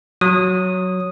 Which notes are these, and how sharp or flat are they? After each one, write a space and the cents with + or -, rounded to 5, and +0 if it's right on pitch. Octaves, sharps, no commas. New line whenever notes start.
F#3 +0 D#6 +0